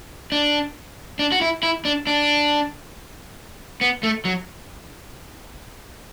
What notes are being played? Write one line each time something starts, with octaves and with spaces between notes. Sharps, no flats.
D4
D4
F#4
E4
E4
D4
D4
B3
A3
F#3